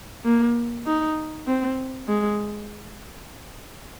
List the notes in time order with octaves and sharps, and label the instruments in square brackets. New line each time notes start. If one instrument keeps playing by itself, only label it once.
[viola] A#3
D#4
C4
G#3